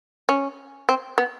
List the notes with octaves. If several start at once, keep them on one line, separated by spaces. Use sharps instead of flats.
C#4
C4
B3